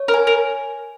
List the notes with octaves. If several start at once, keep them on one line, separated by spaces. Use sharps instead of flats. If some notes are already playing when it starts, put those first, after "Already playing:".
Already playing: C#5
A#4
G#5
A#4